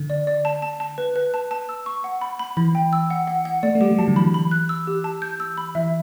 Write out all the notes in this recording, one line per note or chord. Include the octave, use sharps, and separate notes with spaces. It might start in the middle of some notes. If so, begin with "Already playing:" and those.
Already playing: D3
D5
D5
A5
A5
A5
B4
B4
A5
A5
E6
C#6
F#5
B5
B5
E3 B5
G5
E6
F#5
F#5
F#5
A3 D5
A3
G3 G4
G3
F#3 A5
D3
E3 B5
B5
F#6
E6
G4
A5
G6
E6
B5
E3 E5